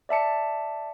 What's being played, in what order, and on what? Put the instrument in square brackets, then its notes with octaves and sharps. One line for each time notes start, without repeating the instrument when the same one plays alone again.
[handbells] D5 E5 A5 C#7